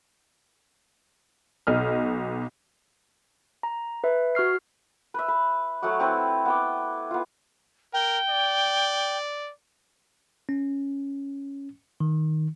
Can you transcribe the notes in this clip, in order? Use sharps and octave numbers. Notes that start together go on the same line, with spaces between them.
B1 D#5 F6
A#5
B4 E5
F#4 C#6 F6 C7
B4 E5
B4
F#3 A3 F#5 D#6
C4 E4 B4
B3 G5 D6
B3 F4
A#4 G5
D5
C#4
D#3